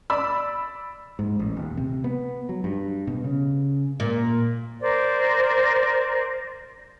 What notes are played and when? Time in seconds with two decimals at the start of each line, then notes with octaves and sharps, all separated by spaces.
0.10 D5 B5 E6
1.19 G#2
1.39 A1
1.57 D#1
1.77 C3
2.04 B3
2.49 F#3
2.64 G2
3.07 B2
3.24 C#3
4.00 A#2
4.81 A#4 C5 D5